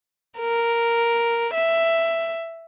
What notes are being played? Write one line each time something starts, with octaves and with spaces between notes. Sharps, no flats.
A#4
E5